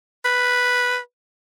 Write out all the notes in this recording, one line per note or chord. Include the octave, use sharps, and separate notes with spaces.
B4